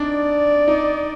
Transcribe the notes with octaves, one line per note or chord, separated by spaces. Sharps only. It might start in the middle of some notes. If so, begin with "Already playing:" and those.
Already playing: D4 D#4 D5
D#4